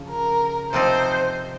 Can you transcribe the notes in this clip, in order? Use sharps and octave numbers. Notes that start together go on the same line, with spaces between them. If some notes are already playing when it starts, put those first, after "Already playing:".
Already playing: C#3 F3
A#4
C3 F3 C4 D#4 C5